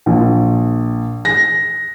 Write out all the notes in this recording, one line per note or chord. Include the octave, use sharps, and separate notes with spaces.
A#1
A#6